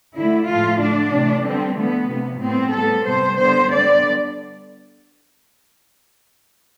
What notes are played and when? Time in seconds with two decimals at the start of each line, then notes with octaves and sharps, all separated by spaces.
0.15 D3 A3 E4
0.48 A2 F3 A3 F4
0.80 D3 A3 D4
1.13 C3 E3 A3
1.45 D3 G3 B3 C4
1.77 D3 F3 A3 B3
2.09 C3 F3 B3
2.42 A2 G3 B3 C4
2.74 A2 G3 B3 A4
3.06 C3 G3 B3 C5
3.38 D3 G3 B3 C5
3.71 D3 G3 B3 D5